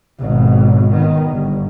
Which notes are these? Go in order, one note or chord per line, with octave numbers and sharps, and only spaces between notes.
G#1 B2
D#3 B3
G1